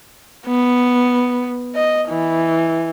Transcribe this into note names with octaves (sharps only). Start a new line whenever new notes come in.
B3
D#5
E3